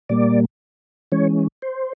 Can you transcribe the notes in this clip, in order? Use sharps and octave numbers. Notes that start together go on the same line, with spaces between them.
A#2 G3 A#3 D5
E3 G#3 C#4 C#5
C5